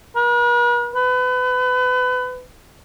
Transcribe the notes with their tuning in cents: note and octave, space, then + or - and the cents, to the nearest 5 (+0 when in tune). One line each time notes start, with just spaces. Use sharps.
B4 -45
B4 +30